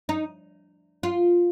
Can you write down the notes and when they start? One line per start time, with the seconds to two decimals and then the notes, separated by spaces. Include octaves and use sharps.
0.09 D#4
1.03 F4